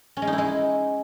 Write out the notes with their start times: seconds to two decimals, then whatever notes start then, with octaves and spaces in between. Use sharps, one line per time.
0.17 C#4
0.22 G#3
0.27 D#4
0.33 E4
0.38 G#3